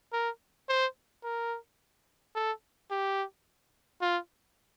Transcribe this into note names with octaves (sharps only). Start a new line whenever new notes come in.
A#4
C5
A#4
A4
G4
F4